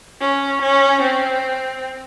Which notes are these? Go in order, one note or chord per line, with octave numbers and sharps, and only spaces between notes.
C#4
C#4
C4